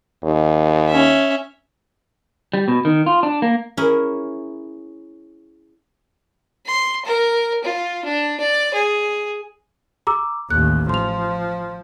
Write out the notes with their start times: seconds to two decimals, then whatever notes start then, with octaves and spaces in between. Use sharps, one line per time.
0.23 D#2
0.88 C#4 E5
2.54 G3
2.68 B2
2.85 D#3
3.06 F4
3.23 D4
3.42 A#3
3.77 C#4 E4 G#4 A#4
6.66 C6
7.05 A#4
7.64 F4
8.05 D4
8.40 D5
8.74 G#4
10.07 A#5 D6 E6
10.51 A1 D#2 F#6
10.89 F3 C6 F7